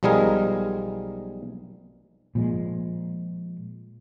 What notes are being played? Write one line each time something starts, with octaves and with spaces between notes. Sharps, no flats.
B1 F3 G3 G#3 G#4 A#4
A#2 F3 G#3